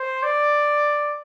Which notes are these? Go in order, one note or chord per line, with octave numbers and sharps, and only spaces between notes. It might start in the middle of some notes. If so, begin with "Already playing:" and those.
Already playing: C5
D5